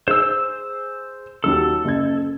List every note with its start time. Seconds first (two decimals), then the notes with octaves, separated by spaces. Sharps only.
0.08 G#4 C5 E6
1.44 D#2 F#3 G4 A4
1.85 F#1 G#6